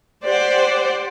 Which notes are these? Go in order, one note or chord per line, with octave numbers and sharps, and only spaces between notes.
G4 C5 D5 F#5